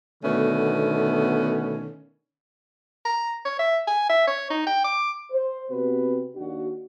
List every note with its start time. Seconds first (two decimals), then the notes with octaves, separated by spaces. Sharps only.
0.24 B2 D3 D#3 A3 B3 C#4
3.05 A#5
3.45 C#5
3.59 E5
3.87 G#5
4.09 E5
4.27 C#5
4.50 D#4
4.67 G5
4.84 D6
5.31 C5
5.70 C3 B3 C4 F#4 B4
6.35 D#2 D4 F#4